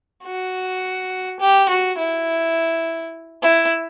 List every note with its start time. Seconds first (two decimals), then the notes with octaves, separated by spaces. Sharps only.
0.24 F#4
1.40 G4
1.69 F#4
1.98 E4
3.43 E4